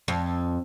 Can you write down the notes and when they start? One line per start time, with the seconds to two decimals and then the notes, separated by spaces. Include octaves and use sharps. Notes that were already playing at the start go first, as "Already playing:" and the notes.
0.08 F2